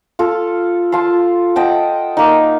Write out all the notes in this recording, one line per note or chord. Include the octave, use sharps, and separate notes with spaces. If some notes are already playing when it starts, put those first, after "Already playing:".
F4 A4 F5
F4 A5 C6
D#5 F#5 G5 A5
A#3 D#4